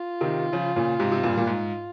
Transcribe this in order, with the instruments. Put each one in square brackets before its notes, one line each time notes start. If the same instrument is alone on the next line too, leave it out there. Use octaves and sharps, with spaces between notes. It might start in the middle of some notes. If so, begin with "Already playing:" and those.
Already playing: [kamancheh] F4
[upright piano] C3 D#3
C#3 F3
A#2 C#3
G#2 C3
C3
G2 A#2
A#2
G#2